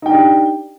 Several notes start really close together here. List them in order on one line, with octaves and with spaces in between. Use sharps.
D#4 G5 D4 G4